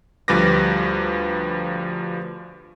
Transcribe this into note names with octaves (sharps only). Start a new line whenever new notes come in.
D2 F3 G3 B4 D6 A#6